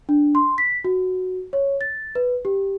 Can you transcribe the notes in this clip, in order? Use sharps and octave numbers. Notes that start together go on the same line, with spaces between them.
D4
C6
B6
F#4
C#5
A6
B4
G4